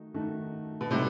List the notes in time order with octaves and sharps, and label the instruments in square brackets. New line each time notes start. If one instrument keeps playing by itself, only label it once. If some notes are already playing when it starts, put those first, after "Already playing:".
Already playing: [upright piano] D#3 A3 D#4 F#4
D#3 A3 D#4 F#4
[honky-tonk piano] B2
[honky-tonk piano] A2 C3 [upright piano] G3 D#4 F#4 A4